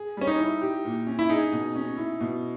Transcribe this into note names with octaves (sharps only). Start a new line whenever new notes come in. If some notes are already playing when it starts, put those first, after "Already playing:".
Already playing: G#4
G3 C#4
D#4
E4
G4
A#2
C#4
E4
D#4 G#4
B2
C#4
E4
B2